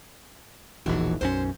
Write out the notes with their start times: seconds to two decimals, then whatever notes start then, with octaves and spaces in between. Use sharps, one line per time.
0.86 E1 A#1 E3 D#4 F#4
1.21 B1 F#2 C#4 C5